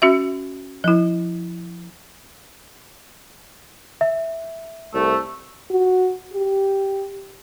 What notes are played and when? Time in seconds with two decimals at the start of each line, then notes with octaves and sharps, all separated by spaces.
0.02 C#4 F#4 E5
0.84 F3 E4
4.01 E5
4.95 C2 A3
5.70 F#4
6.34 G4